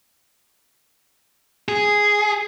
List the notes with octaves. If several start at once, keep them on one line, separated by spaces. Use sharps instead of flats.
G#4